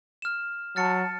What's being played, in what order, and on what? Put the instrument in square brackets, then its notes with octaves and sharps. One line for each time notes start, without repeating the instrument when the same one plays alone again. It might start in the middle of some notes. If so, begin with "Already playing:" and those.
[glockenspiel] F6 E7
[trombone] F#3 [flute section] A5 [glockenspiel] F6 A6 C#7